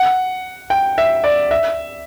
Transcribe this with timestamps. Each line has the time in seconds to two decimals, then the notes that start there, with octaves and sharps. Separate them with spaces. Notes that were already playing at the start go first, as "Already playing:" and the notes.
Already playing: F#5
0.70 G5
0.98 E5
1.24 D5
1.51 E5